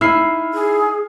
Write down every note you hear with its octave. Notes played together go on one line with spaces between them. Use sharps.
D#4 E4 E6 F6 C7
G#4